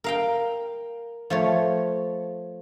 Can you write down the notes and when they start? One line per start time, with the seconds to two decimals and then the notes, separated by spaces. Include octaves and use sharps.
0.04 A#4 F5 G5
1.30 F3 A3 C#5